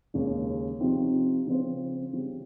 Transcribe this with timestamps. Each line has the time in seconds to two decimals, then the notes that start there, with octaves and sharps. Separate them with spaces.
0.14 D#2 C#3 G#3 C#4
0.80 C3 F3 C4 D#4 G4
1.47 C#3 F3 C4 F4 C5
2.13 C#3 G3 C4